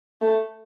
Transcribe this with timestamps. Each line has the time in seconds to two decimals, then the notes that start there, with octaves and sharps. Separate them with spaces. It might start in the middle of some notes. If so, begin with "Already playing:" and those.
0.21 A3